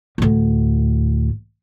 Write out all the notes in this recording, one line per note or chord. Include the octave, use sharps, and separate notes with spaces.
D2 A2